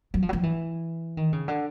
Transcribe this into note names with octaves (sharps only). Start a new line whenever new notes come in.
F#3
F3
F#3
F3
E3
D#3
C#3
D3